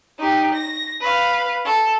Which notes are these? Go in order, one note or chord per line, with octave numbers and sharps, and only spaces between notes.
D#4 G4
A#6
B4 F5
A4